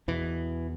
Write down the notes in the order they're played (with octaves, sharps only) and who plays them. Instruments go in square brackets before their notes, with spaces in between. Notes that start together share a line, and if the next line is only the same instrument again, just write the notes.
[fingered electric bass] E2 B2 E3